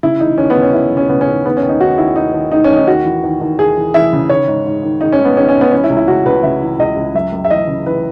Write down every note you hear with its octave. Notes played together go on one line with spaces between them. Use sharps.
C#3 E4
E3 D#4
D#2 C#4
B3
C#3
C#4
D#2 E4
C#3
C#4
C#3 B3
C#4
D#2
D#3 B3
C#4
D#2
D#4
D#3 F#4
D#2 E4
D#3 D#4
D#2
D#3 D#4
C#4
D#2
D#4
D#2 F#4
E3
D#2
D#2
D#2 G#4
E3
E3 E5
C#3
D#3 C#5
G#2
G#2
D#3
D#3 D#4
C#4
G#2
B3
D#3 C#4
C#4
G#2
B3
E3 C#4
E4
C#2
E4
C#2 F#4
C#2 B4
C#3 E5
E3
C#2 D#5
C#2
F#2 E5
F#2
E5
E3 D#5
C#3
E3 B4